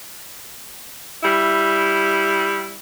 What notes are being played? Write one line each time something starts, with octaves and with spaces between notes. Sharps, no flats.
G3 E4